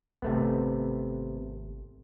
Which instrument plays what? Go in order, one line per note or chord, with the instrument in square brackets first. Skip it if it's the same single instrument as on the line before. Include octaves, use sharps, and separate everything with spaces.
[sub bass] G#1 [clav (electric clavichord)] C3 A3 B3